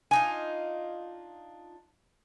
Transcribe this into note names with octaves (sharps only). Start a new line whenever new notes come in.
D4 D#4 F4 G#5